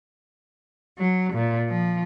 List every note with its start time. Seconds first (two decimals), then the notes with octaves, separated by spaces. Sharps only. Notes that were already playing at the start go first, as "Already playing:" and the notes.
0.97 F#3
1.32 A#2
1.70 F3